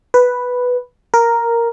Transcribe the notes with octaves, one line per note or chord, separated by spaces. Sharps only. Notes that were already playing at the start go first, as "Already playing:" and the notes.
B4
A#4